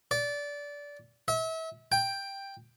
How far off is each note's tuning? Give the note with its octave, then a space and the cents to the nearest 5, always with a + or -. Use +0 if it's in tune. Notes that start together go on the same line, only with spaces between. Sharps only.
D5 -20
E5 -35
G5 +10